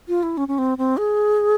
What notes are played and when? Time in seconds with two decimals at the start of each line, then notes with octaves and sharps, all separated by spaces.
0.08 F4
0.23 E4
0.37 C#4
0.48 C#4
0.58 C4
0.78 C4
0.97 G#4